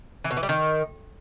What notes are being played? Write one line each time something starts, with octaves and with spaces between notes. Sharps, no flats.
E3
B2
E3
G3
D#3